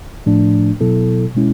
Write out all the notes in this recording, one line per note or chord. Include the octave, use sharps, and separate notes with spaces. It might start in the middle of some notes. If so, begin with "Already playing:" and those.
A2 F3 A3 D4
B2 F#3 B3 E4 A4
B2 G#3 C#4 E4